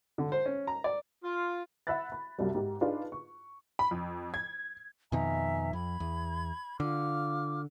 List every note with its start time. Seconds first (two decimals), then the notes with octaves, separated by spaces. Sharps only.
0.18 D3
0.32 C5
0.46 C#4
0.67 A#5
0.84 D5
1.24 F4
1.87 E5 F#5 B5 F#6 A6
2.12 B5
2.39 C2 F#2 G3
2.55 G#2 G4
2.81 D4 D#4 F4 G#4 B4
3.12 C#6
3.79 B5
3.91 F2
4.34 G#6
5.12 F2 B2 D#3 E5 G#5 A#5
5.73 F2 B5 G#6
6.00 E2
6.80 D3 F4 D6 F6